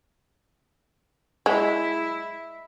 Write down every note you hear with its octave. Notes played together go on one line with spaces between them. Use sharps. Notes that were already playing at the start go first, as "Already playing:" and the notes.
G#3 E4